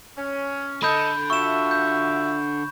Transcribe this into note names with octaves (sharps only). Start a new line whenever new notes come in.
C#4
D3 A4 D#5 B5 G6
F4 F#4 E5 C#6 E7
G6